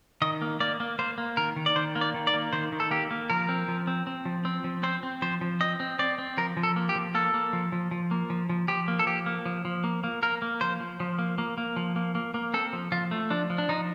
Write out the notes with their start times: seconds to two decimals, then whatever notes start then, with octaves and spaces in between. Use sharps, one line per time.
0.22 D#3 D#5
0.42 A#3
0.60 A#3 D5
0.80 A#3
0.99 A#3 C5
1.18 A#3
1.37 D#3 A#4
1.56 D#3
1.66 D5
1.76 D#3 C5
1.95 A#3
2.01 D5
2.14 D#3
2.27 D5
2.33 A#3
2.53 D#3 C5
2.72 D#3
2.80 A4
2.91 A#3 G4
3.11 A#3
3.30 F3 A#4
3.49 C4
3.68 F3
3.87 C4
4.07 C4
4.25 F3
4.45 C4
4.64 F3
4.83 C4 C5
5.03 C4
5.22 F3 C5
5.41 F3
5.61 C4 D#5
5.80 C4
5.99 C4 D5
6.18 C4
6.38 F3 A#4
6.57 F3
6.63 A4
6.76 A#3
6.89 G4
6.96 F3
7.15 A#3 A4
7.34 A#3
7.53 F3
7.72 F3
7.91 F3
8.11 A#3
8.30 F3
8.50 F3
8.68 F3 G4
8.88 A#3
8.99 A4
9.07 F3 G4
9.26 A#3
9.46 F3
9.65 F3
9.84 A#3
10.04 A#3
10.23 A#3 A#4
10.42 A#3
10.61 F3 C5
10.80 F3
11.00 F3
11.19 A#3
11.38 A#3
11.58 A#3
11.76 F3
11.96 A#3
12.15 A#3
12.34 A#3
12.54 C4 A4
12.73 F3
12.92 F3 F4
13.11 A3
13.30 F3 D4
13.50 F3
13.58 D4
13.69 F3 D#4